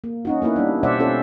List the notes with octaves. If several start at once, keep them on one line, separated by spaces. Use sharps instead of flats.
A#3
C#4 D#4 F#4
A#3 B3 E4 B4
G3 D4
B2 G3 C5 D5 E5 F#5
C#4 F4 A4 C5 D5